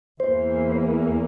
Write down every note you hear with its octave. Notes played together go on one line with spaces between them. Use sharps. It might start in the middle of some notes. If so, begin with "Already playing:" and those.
E2 E3 A#3 C5